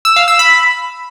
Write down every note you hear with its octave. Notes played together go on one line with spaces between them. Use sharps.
E6
F5
E6
B5